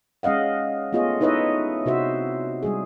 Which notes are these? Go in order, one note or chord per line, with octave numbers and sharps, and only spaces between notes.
G#3 C#4 D#5 F5 F#5
A3 B3 F4 G#4 C#5 D#5
D#4 E4 B4 C#5 D#5 E5
C3 F#4 C5 E5
G3 G#3 G#4